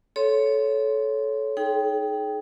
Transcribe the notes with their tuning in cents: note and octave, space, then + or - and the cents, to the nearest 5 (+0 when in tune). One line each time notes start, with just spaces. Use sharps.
A4 -20 C#5 +5 C6 +0
D#4 +5 G#4 +35 G5 +0